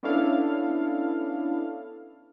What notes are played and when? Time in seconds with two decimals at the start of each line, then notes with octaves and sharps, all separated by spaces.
0.03 B3 C#4 D4 E4 A4 F5